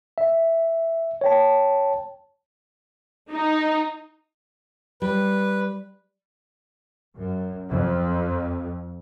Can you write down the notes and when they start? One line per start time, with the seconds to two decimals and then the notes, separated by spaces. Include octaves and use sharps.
0.18 E5
1.21 C#5 G5 A5
3.30 D#4
5.02 G3 B4
7.17 F#2
7.71 F2